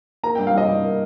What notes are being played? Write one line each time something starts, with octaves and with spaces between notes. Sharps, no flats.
A#3 A#5
G5
G2
F5
G3 D#5
G2
A#3